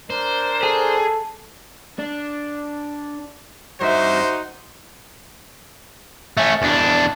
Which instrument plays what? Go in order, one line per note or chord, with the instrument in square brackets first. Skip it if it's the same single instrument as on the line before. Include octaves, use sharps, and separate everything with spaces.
[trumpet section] D4 A#4 [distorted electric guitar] C5
[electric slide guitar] G#4 [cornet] A4
[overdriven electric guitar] D4
[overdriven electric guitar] G2 E5 [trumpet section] D#4 F#4 C5
[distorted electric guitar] A3 C#4
E2 D4